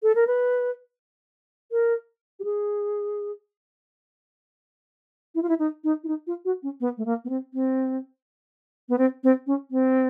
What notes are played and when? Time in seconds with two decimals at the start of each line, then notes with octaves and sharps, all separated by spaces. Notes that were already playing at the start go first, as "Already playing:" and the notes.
0.03 A4
0.15 A#4
0.27 B4
1.72 A#4
2.40 G4
2.44 G#4
5.35 E4
5.43 F4
5.49 E4
5.59 D#4
5.84 D#4
6.04 E4
6.08 D#4
6.27 F4
6.45 F#4
6.63 C#4
6.81 B3
6.98 A3
7.06 A#3
7.25 B3
7.29 C4
7.54 C4
8.89 B3
8.98 C4
9.24 C4
9.47 C#4
9.71 C4